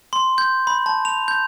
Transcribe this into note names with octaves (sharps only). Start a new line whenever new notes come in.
C6
G6
B5
A5
F7
G6